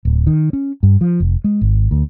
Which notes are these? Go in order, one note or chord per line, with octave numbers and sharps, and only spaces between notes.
D1
D#3
C#4
G2
F3
F1
G#3
G#1
D2